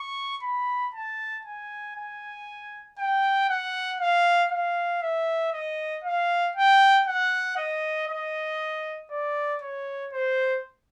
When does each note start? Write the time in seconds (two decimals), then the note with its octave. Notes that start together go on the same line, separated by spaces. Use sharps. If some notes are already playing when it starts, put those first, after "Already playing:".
Already playing: C#6
0.43 B5
0.94 A5
1.45 G#5
1.96 G#5
2.98 G5
3.49 F#5
4.01 F5
4.52 F5
5.02 E5
5.53 D#5
6.04 F5
6.56 G5
7.07 F#5
7.57 D#5
8.08 D#5
9.11 D5
9.62 C#5
10.13 C5